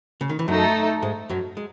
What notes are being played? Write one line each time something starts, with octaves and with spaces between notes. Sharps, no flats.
C#3
D#3
E3
F#2 F#3 A3 D#4 A4
G#2 G#3
F#2 F#3
G#3